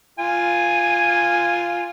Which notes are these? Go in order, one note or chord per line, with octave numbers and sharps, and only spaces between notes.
F4 G#5